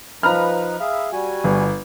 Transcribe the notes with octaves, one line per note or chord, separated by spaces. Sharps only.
F3 D#4 B4 A#5 B5 F6
G#4 E5 F5
G3 F#4 G#5
G1